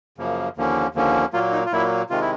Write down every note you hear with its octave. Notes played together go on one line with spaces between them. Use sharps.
F#2 C#3 F3 A#3
D#2 D3 F3 A#3 C#4
D#2 D3 F3 A#3 C#4
A#2 F#3 A#3 F4
D#4
F4
A#2 F#3 A#3 E4
C3 D#3 G#3 F4
E4